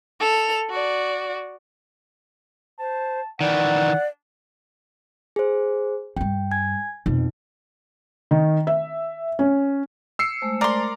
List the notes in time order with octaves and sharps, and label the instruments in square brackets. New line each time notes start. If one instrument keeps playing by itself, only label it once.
[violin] A4 F7
F#4 D5
[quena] C5 [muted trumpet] A5
[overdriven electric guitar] D#3 E3 [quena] D5 [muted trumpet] F#5
[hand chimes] G#4 C5
[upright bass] G2 G3 [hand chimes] G5
[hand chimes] G#5 G#6
[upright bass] F2 B2 [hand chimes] D#4
[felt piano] D#3
E5
C#4
[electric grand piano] E6 C7 C#7
[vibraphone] G#3 A3 C5
[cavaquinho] A#4 C6 [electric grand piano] D5 A#5 D6